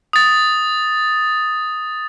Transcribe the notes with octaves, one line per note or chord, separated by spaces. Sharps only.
D#6 A6